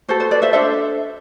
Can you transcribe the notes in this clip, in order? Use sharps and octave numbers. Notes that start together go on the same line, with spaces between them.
F#4 A4 C5
C5
B4 D5
C5 E5
D4 A4 C5 E5